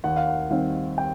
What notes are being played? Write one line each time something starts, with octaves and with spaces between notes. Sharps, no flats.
D#2 F#5
F5
F#5
D#3 G3 C4 F5
G5